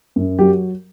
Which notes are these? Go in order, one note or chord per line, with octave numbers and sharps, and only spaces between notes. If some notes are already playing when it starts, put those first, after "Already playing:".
F#2
F#3 G4